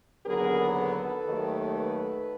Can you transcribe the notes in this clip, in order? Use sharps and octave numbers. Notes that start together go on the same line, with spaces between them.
D#2 D3 F#3 B3 G#4 A#4
A4 B4
D#2 D#3 F#3 A3
A4 B4